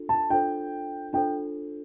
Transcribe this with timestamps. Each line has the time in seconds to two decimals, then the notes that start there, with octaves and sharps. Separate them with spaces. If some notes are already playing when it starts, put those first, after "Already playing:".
Already playing: D4 F4 A4
0.09 A5
0.30 D4 F4 A4 C5 G5
1.13 D4 F4 A4 C5 G5